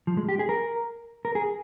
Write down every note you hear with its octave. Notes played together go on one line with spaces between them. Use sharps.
F3
G#3
G4
G#4
A#4
A#4
G#4